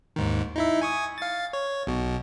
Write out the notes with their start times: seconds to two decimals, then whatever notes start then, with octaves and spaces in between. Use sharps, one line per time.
0.16 D#2 G#2 D#3
0.56 D#4 E4 E5
0.81 G#5 C#6 D#6
1.18 F5 A6
1.53 C#5
1.87 B1 B2